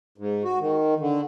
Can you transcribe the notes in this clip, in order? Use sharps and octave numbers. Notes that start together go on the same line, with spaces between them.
G#2
F#4
D#3
D3